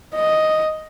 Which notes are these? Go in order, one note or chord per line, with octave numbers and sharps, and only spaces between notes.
D#5